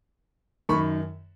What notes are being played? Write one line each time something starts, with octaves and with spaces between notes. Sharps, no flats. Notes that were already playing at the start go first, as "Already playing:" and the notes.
F#2 D#3 B5 C#6